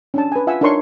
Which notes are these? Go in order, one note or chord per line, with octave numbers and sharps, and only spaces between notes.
C#4 D4 A5
B4 G#5
F4 E5 F#5 G#5 E6
D4 D#4 A#4 C#5 C6 C#6